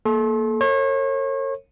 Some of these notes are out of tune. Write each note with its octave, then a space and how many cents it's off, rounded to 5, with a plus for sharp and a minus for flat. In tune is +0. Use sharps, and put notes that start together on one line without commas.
A#3 +0 A4 -30 C6 +35
A#4 -45 C#5 -35